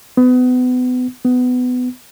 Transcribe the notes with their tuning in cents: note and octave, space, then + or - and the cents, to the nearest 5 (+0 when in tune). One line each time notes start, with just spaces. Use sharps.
B3 +30
B3 +20